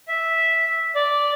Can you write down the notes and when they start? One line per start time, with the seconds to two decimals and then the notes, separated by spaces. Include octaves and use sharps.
0.08 E5
0.95 D5